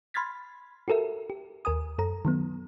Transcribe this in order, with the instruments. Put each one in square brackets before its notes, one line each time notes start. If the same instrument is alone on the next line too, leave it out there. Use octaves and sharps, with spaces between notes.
[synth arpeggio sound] B5 C6 F6 G#6 A6 B6
F#4 G4 A4 A#4 E5
G4
D#2 A#4 G#5 D#6
F#2 A4 A#5
D#3 F#3 B3